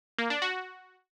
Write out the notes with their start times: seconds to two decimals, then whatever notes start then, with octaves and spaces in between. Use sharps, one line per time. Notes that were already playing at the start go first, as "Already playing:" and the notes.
0.18 A#3
0.30 D4
0.42 F#4